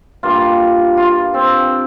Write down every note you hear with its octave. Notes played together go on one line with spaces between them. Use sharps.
G2 G3 A#3 F4
F4
C4